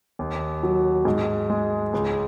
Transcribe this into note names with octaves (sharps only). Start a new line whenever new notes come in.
D#2
F#3
G#2
G#3
C#2